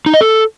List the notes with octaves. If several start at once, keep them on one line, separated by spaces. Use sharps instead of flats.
D#4
D#5
A4